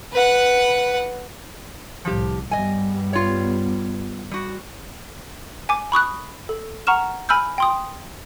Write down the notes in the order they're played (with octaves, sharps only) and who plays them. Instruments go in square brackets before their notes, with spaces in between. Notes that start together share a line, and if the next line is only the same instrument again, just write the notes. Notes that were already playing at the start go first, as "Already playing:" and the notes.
[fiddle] B4 F#5
[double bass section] C2 A2 [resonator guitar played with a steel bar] F3 G4
[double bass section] G2 G3 B3 [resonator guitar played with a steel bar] D#5 G#5
[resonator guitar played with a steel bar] F4 C#5
G3 F#4
[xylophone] G#5 D6
B5 C#6 D#6 F#6
A4
F#5 A#5 C#6 F6 E7
G#5 B5 E6 F6 G6
G5 C6 D#6